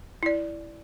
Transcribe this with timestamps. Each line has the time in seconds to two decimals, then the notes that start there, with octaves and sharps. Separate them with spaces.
0.23 E4 D5